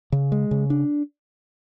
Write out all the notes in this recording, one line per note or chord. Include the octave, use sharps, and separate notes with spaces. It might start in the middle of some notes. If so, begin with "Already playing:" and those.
C#3
G#3
C#3
D4